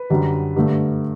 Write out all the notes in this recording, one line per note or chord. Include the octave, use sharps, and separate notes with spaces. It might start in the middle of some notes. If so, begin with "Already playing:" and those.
Already playing: B4
F#2 D3 G3
G2 D3 A3